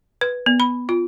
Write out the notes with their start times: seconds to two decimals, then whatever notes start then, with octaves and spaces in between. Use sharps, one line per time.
0.21 B4
0.46 B3
0.60 B5
0.89 F4